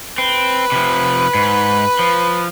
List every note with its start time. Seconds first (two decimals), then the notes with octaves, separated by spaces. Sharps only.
0.18 C4 B4
0.72 C3 F3
1.34 G#2
1.99 F3